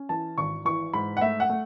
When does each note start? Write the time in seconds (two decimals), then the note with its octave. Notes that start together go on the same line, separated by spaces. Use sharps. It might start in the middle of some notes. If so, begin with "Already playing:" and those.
Already playing: C#4
0.09 E3 A5
0.38 G#1 C#6
0.65 E3 C#6
0.94 G#2 B5
1.17 F#5
1.21 A3 E5
1.40 F#5
1.50 A3